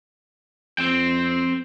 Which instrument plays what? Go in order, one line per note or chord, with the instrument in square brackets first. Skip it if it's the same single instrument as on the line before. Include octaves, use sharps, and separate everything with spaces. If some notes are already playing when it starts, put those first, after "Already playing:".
[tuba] F2 [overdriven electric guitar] C4 G5